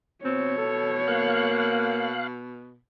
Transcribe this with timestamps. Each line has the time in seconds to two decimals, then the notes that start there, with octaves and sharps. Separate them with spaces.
0.25 B2 C4 C#5
0.58 A4
1.08 A#3 F5 F#6